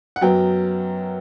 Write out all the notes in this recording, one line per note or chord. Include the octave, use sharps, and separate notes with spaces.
F#5
F#2 F#3 B3 G5